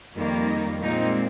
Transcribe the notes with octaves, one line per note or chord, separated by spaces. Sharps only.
F2 D#3 G3 A#3
D#4
A#2 G#3 C4 D#4